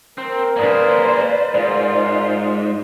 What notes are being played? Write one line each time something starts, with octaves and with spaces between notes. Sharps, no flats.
C4 A#4
A#3 G#4 B4 C5 D5
G#2 F4 A#4 C5